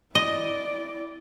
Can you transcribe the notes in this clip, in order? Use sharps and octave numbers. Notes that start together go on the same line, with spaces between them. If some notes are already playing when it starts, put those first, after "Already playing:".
E4 D5 D#5